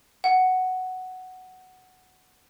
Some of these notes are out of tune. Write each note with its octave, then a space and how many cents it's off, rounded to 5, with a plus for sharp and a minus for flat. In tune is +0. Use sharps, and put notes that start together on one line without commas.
F#5 +5